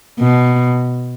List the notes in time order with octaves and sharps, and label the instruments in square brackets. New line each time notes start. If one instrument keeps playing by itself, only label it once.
[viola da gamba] B2